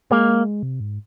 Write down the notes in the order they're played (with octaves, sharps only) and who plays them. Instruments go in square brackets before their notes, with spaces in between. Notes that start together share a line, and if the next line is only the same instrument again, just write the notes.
[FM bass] G#3 [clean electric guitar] A#3
[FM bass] C3
G#2